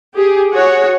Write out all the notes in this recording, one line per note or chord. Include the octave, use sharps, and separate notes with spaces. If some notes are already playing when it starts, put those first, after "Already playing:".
G4 G#4
F#4 G#4 C#5 F#5